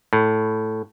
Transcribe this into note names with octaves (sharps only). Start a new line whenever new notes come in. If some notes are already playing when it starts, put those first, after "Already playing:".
A2